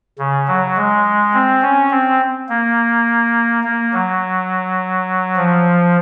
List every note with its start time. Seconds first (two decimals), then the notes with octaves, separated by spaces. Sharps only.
0.19 C#3
0.48 F#3
0.77 G#3
1.34 C4
1.62 C#4
1.91 C4
2.49 A#3
3.64 A#3
3.94 F#3
5.36 F3